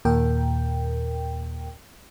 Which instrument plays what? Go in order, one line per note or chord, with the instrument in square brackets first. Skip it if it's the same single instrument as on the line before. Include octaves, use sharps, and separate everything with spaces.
[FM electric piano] D#2 A#2 A#4 G5